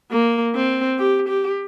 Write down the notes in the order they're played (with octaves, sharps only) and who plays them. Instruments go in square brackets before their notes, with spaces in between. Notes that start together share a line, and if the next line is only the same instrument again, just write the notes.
[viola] A#3
C4
G4
G4